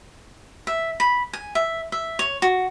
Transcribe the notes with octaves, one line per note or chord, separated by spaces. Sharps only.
E5
B5
G#5
E5
E5
C#5
F#4